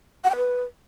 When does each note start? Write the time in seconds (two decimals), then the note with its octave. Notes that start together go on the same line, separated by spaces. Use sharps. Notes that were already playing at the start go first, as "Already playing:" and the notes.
0.24 F#5
0.30 G5
0.36 B4